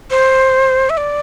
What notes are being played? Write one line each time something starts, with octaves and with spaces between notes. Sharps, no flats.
C5
E5
D5